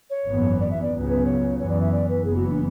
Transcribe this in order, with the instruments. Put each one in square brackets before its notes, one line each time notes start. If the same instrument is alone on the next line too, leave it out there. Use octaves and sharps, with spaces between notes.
[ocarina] C#5
[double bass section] G#1 F#2 E3 B3
[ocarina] D5
E5
D5
[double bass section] C#2 C#3 F#3 B3
[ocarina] B4
C#5
[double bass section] F#2 E3 B3 [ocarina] C#5
[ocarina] D5
E5
D5
B4
[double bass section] F#1 F#2 E3 B3 [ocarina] G#4
[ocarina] F#4
D4